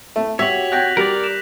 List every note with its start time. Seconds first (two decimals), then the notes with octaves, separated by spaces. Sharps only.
0.16 A3
0.39 F#4 G4 C#5 E5 B6 F7 F#7
0.72 F#5 G5 F#6 G6 A#6
0.97 G3 A#4 D5
1.24 E7